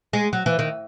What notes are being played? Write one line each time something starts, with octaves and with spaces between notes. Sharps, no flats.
G#3
F#3
E3
D#3